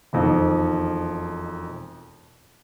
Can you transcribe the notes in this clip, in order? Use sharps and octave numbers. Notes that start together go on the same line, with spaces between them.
E1 F2 D#3